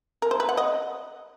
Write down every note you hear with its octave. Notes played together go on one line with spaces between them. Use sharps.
A#4
C5
B4
F#5
D#5